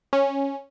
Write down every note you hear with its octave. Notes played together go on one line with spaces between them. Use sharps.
C#4